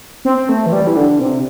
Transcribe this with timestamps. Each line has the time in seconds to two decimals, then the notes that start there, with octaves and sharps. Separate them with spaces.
0.25 C4
0.49 A3
0.66 E3
0.72 G3
0.87 E3
0.96 D3
1.20 C3